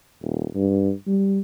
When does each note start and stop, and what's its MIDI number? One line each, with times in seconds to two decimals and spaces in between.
0.22 0.47 27
0.55 0.92 43
1.07 1.40 55